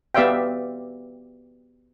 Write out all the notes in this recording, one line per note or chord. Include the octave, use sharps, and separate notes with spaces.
B3 G4 D5 E5 F5 G5